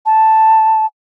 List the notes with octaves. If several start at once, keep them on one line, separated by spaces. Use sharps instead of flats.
A5